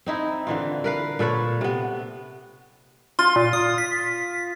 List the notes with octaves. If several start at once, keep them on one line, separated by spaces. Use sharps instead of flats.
C4 D#4 E4
D3 E3 F4
A#4 B4 F5
A#2 A4 B4 C#5
C3 B3
F4 C6
A#2
D#6
B6